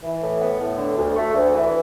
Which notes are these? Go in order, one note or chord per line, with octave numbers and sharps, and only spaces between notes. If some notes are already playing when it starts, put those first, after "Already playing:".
E3
A2
B3
A2
D3
D2
A3
D2
E3